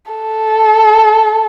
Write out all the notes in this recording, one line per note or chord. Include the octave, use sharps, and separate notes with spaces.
A4